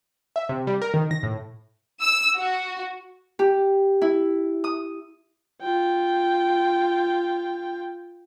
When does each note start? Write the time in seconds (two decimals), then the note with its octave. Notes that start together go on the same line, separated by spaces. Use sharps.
0.36 E5
0.49 C3
0.67 G3
0.82 A#4
0.94 D#3
1.11 A#6
1.23 A2
2.01 E6
2.36 F#4
3.39 G4
4.02 E4
4.64 D#6
5.62 F4 G5